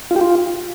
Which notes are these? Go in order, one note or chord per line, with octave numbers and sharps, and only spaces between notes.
F4
G4
F4